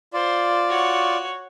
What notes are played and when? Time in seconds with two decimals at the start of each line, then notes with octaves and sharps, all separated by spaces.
0.13 F4 C5 D5
0.68 F#4 C#5